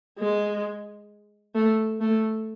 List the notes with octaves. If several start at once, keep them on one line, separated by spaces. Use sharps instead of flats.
G#3
A3
A3